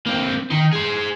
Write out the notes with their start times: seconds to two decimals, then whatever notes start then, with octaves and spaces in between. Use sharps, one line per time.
0.06 A#3 C4
0.50 D#3 D#4
0.73 G#4 C5